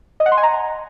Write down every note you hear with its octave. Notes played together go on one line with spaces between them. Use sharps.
D#5
F#5
C6
G#5
A#5